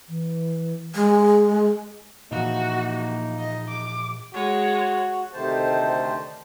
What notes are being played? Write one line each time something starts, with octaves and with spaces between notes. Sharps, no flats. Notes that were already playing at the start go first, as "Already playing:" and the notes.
E3
G#3
A#2 E3 F3 A#3 D#4 F#4
D#5
D6
G#3 F#4 C#5
D2 C3 D#3 A3 C5 A5